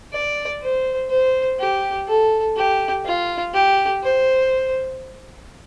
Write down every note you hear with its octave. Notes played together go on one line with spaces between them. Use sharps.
D5
C5
C5
G4
A4
G4
F4
G4
C5